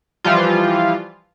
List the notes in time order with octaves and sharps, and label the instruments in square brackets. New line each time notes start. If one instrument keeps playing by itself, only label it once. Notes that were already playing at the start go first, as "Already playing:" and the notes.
[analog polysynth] E3 F3 G3 F4